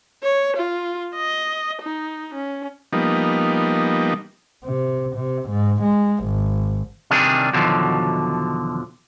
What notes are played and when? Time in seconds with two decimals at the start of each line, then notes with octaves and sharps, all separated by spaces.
0.23 C#5
0.57 F4
1.15 D#5
1.82 D#4
2.34 C#4
2.93 F3 G3 A#3 B3 D#4
4.64 C3
5.16 C3
5.49 G#2
5.82 G#3
6.25 G#1
7.11 C3 D#3 E3 G3 D4 G#4
7.53 E2 B2 D3 D#3 F3 F#3